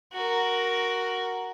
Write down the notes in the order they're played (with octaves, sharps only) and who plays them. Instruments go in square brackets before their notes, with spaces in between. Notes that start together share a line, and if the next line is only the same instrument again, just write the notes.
[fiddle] F#4 A#4